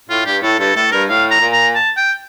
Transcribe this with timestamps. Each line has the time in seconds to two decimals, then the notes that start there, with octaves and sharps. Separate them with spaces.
0.09 A2 F4
0.25 G2 G4
0.42 A2 A4
0.59 G2 A4
0.75 A2 A4
0.92 G2 A#4
1.08 A2 F5
1.31 A#5
1.41 A#2
1.53 A#5
1.75 A5
1.97 G5